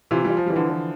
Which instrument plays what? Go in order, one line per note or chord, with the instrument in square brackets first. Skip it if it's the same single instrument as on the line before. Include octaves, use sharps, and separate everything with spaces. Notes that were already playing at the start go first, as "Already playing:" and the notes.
[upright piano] C3 E3 [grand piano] F4
[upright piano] E3 G3
[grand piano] F4
[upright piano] F3
[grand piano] E3 [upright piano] G3
[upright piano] D3 F3
[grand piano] E3